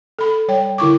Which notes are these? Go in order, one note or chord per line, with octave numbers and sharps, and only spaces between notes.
A4 B5
G3 C#5 G5
D3 E4 C#6 D6